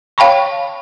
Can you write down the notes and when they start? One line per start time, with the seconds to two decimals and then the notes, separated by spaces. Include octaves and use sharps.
0.18 C#5 F5 G5 A5 B5 C#6